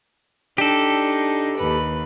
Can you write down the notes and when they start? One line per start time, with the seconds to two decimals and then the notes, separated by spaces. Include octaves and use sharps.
0.58 D4 D#4 G4 A4
1.58 D#2 B4